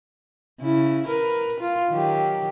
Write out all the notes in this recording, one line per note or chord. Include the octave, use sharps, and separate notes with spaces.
C#3 E4
A#4 B4
F4
D#3 F#3 G4